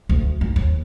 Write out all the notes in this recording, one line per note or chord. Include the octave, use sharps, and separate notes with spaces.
D2
G#2
D#2